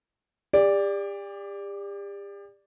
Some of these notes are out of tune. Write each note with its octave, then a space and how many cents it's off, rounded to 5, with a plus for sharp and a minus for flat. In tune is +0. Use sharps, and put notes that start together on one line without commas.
G4 +40 D5 +0